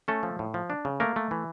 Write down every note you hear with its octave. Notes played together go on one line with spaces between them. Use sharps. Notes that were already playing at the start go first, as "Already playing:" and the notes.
A3 C#4 A4
F3
A2
F3
D4
C#3
A3 A#3 A#4
A3
E3